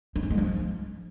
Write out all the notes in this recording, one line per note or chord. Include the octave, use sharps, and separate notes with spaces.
D#4
C#4
G#3
F3